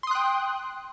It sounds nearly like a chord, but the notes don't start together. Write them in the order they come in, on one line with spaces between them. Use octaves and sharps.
C6 D#6 F#6 G5